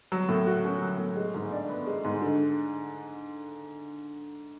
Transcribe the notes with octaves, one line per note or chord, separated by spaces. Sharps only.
F#3
A2
F#4
C#4
F#3
A2
G#3
G#2
D4
B3
G#3
G#2
D3